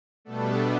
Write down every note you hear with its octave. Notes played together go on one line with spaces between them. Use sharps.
B2 G3 A3 B3 D4 A4